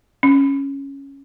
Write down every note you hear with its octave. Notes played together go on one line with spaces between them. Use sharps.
C#4